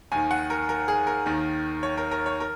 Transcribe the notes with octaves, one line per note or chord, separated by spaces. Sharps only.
D#2 D#3 G#5
F#5
A#4
A#4
G#4
A#4
D#2 D#3
C#5
A#4
A#4
C#5
A#4